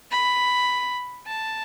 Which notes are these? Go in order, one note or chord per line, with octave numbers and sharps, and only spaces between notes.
B5
A5